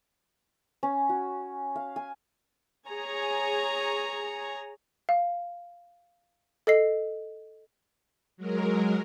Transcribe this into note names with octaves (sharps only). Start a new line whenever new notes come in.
C#4
F#4
F5
G#5
G#4 C#5 G#5 A#5
F5
A4 D#5 C7
F#3 G#3 A#4